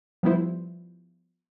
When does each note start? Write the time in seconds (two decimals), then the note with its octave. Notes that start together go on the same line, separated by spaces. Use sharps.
0.23 F3 G3 B3 E4 C5